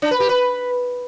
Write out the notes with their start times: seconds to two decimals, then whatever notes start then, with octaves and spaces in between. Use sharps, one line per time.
0.02 D4
0.11 B4
0.20 G4
0.29 B4